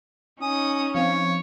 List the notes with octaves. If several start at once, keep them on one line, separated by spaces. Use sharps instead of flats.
C#4 D#4 G#5 D#6
F3 C4 C#5 F5